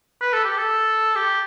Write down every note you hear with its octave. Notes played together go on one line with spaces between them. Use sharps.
B4
A4
G4
A4
G4